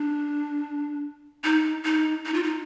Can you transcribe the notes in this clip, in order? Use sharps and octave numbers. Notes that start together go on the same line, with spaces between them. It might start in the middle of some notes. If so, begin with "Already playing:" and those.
Already playing: D4
D#4
D#4
D#4
F4
D#4